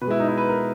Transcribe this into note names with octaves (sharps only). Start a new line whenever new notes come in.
B2 B4
G#3 E4
D#4
E4
B4
A#4